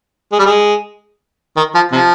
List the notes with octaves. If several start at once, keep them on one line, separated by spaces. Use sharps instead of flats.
G#3
G3
G#3
D#3
F3
C3 F3